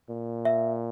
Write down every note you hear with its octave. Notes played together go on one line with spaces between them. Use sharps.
A#2
E5